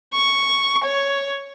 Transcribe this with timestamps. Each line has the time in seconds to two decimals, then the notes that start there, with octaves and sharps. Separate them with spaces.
0.14 C#6
0.84 C#5